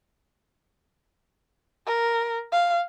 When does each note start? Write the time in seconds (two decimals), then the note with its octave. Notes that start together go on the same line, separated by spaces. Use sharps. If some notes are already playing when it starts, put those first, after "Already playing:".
1.87 A#4
2.52 F5